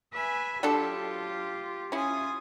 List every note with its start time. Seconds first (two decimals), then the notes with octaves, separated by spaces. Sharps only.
0.12 B4 E5 G#5
0.63 F#3 D4 F4 G4 A4
1.92 C#4 E4 F4 G#5 D#6